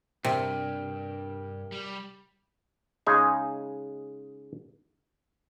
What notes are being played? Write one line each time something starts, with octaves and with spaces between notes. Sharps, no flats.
G2 C3 A#4 G5
G3
C#3 G#3 D#4 G#4 G#5